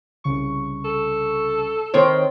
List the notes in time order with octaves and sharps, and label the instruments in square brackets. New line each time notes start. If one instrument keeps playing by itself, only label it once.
[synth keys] C2 C#3 C#6
[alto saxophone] A4
[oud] D#3 C4 C#5